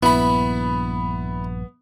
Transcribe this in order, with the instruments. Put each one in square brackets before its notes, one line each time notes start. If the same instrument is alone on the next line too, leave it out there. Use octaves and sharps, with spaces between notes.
[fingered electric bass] A#1 G2 [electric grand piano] B3 [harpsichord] E4 B5